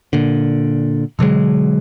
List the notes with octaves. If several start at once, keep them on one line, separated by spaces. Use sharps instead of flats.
A#2 D3
B2 D3 F#3 G#3